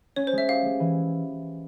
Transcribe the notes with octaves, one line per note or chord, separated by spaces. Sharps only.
C#4 C#5
C5
G#3
E5
G4 F5
G#3
E3